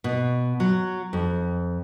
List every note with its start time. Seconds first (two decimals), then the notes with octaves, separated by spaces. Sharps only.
0.04 B2
0.60 F#3
1.13 F2